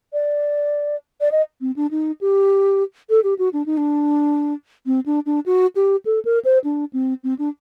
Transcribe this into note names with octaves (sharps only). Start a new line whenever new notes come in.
D5
D5
D#5
C4
D4
D#4
G4
A4
G4
F#4
D4
D#4
D4
C4
D4
D4
F#4
G4
A4
A#4
C5
D4
C4
C4
D4